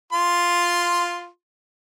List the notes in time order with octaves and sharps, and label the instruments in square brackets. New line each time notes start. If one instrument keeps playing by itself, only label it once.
[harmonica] F4 C6